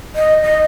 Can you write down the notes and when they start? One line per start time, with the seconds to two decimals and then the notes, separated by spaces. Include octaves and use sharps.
0.15 D#5
0.42 D#5